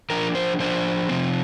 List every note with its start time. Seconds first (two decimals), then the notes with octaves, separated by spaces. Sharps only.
0.10 F3 D4 A#4
0.35 C5
0.60 F3 D4 C5
1.09 C3 F3 C4